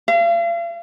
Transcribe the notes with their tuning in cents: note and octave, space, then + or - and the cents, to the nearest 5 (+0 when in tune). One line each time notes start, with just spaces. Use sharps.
F5 -40